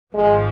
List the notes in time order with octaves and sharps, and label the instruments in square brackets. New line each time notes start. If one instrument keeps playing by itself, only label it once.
[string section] G#1 G#2 F3 [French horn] G#3